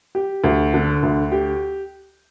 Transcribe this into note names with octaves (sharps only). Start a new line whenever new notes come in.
G4
D2
D3
D2
G4